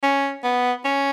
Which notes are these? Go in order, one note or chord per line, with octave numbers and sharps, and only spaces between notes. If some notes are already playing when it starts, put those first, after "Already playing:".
C#4
B3
C#4